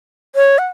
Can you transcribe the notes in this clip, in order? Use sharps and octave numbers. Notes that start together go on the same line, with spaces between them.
C#5
F#5